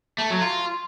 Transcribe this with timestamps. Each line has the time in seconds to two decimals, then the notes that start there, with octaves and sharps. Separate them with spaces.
0.18 A3
0.30 F#3
0.42 F4